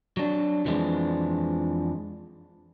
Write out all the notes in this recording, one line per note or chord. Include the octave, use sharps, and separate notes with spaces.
F#3 D4
F2 E3 F3 G#3 D4